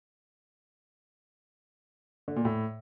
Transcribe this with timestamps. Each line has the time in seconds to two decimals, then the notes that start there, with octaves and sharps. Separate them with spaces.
2.28 D3
2.36 A#2
2.45 A2